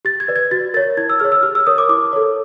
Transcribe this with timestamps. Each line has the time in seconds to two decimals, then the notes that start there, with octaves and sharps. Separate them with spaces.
0.05 G4 A6
0.20 G#6
0.28 B4 D5
0.36 G#6
0.51 F#4 A6
0.74 A#4 C#5 A6
0.97 E4 G#6
1.10 E6
1.20 G#4 C#5 F6
1.32 E6
1.43 G4 F6
1.55 E6
1.67 A#4 C#5 D#6
1.78 D6
1.89 E4 D6
2.13 A4 C#5